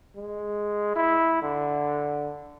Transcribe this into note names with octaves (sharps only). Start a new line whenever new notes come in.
G#3
E4
D3